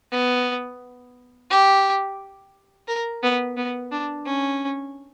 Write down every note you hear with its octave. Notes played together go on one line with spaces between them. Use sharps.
B3
G4
A#4
B3
B3
D4
C#4